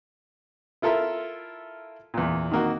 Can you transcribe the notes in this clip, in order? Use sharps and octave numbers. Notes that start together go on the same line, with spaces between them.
E4 F4 A4 A#4 E5
E2 A#2
D#3 A#3 F#4